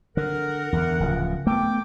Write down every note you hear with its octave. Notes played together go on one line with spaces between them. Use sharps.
D3 A#4 F#5
E2 D3
D1 C#3 F3
A3 B3 G5 D6